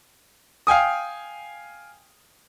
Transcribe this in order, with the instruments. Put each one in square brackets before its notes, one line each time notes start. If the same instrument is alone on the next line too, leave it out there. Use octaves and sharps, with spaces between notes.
[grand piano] F5 G5 G#5 D#6